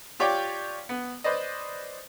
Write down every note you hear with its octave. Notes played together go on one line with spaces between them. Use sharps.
F4 G4 C#5 D5 G5 D6
B3
B4 C5 D5 D#5